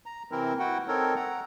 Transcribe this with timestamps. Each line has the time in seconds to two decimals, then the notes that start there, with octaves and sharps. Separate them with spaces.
0.06 A#5
0.31 C3 E3 C4 E4 A#4
0.59 E4 F#4 F#5 G5
0.88 C4 D#4 A4 A#4 C#5
1.16 F#5 A#5